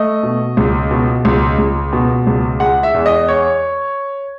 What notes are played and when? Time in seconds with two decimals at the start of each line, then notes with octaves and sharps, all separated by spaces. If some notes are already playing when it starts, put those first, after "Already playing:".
Already playing: A3 D#5
0.23 B2
0.57 C#2
0.91 B2
1.25 C#2
1.58 C#2
1.93 B2
2.27 C#2
2.60 G#3 F#5
2.83 E5
2.94 E2
3.06 D#5
3.28 C#5